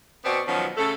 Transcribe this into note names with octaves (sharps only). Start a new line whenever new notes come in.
B2 B3 C4 F#4 D5
B2 D#3 F3 F#3 C#4
C#3 A3 A4